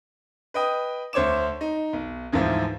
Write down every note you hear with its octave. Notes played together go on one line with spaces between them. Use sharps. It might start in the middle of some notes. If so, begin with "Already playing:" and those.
B4 D#5 G5 D#6
D2 C5 C#5 D6 E7
D#4
B1
D2 G#2 E3 F3